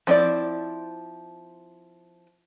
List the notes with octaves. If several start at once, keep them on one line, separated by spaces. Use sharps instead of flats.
F3 C4 E4 C5 D5